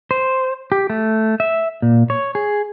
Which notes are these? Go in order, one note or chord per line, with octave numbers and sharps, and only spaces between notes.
C5
G4
A3
E5
A#2
C#5
G#4